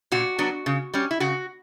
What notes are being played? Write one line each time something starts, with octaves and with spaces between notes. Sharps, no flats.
A#2 F#4
F#3 B3 D4
C#3
G3 C#4
E4
C#3 F#4